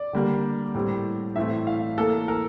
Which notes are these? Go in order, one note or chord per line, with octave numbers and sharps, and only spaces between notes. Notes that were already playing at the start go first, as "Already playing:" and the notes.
Already playing: D5
D3 G3 A#3
A2 G3 C4
A2 E3 A3 C4 E5
F5
E3 A#3 A4
A#4